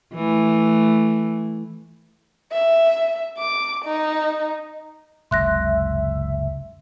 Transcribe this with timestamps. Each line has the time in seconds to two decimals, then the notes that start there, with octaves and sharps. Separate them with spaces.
0.14 E3 A3
2.52 E5
3.38 D6
3.85 D#4
5.31 F#1 C#2 C3 E5 C6 F#6 A#6